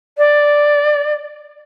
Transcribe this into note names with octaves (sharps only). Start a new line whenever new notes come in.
D5